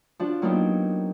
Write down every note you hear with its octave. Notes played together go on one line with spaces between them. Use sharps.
F3 D4 F#4
F#3 A#3 B3 D4 D#4 G4